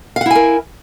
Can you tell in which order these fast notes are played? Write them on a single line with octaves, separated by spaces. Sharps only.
F5 F#5 E4 G#5 A#4